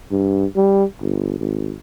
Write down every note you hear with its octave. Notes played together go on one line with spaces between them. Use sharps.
G2
G3
G1
G#1